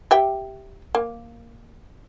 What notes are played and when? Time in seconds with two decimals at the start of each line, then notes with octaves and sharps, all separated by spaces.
0.11 G4 E5 G5
0.95 A#3